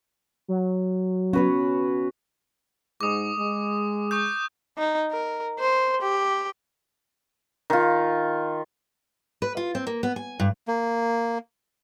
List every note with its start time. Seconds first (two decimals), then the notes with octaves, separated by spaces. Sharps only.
0.48 F#3
1.33 B3 C#4 F#4 B4 C#5
3.01 G#2 D6 D#6
3.37 G#3
4.11 C#6 D#6 G6
4.78 D#4
5.11 A#4
5.60 C5
6.01 G4
7.70 D#3 F4
9.42 B4
9.57 F4
9.75 C4
9.87 A#3
10.03 B3
10.16 G#5
10.40 G2
10.68 A#3